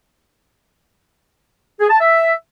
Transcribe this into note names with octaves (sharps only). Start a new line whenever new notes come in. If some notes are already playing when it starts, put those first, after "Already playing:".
G#4
A5
E5